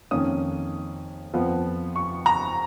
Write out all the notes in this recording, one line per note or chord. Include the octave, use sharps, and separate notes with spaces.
F2 D#3 A#3 C#4 D#6
F2 F3 B3
C#6
A#5